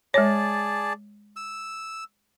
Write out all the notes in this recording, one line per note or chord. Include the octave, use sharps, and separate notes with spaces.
G#3 G#4 C#5 D5 A5
E6